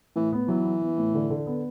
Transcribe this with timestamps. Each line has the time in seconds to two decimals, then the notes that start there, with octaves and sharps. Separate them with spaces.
0.16 A2 E3
0.33 B3
0.48 E3 F#3
0.64 B3
0.81 B3
0.98 A2
1.14 D3
1.30 D3
1.46 B3